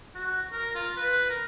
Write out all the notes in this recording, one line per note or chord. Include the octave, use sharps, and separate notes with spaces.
F#4
A#4
F4
B4
A#4